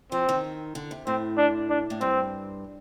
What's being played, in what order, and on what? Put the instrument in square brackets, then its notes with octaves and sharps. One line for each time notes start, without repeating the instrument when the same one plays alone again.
[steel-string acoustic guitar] F3 [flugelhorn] C4
[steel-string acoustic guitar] D#3
D3
C3
[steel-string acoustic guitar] A2 [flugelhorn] C4
[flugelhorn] D4
D4
[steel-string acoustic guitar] A2
[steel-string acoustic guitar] G2 [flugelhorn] C4